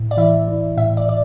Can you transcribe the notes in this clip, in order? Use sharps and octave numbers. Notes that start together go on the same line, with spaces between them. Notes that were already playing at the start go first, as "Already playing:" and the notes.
Already playing: A2
D5
E3 E5
E3
A2 E5
D5
A2 D5